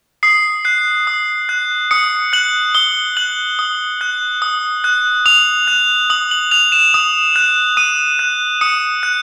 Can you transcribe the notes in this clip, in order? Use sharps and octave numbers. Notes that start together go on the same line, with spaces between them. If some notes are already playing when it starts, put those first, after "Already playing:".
D#6 C7
F#6 C7
D#6
F#6
D#6 C#7
F#6 F#7
D#6 G7
F#6 F#7
D#6
F#6
D#6
F#6
D#6 F7
F#6
D#6 F#7
F#7
F#6 F7
E7
D#6
F#6
D#6 D#7
F#6
D#6 C#7
F#6